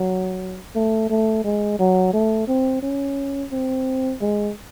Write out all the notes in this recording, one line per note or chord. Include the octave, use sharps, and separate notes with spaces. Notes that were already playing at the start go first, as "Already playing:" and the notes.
Already playing: F#3
A3
A3
G#3
F#3
A3
C4
C#4
C4
G#3